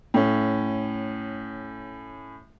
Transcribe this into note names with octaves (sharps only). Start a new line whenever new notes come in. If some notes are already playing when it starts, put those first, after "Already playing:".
A2 C#4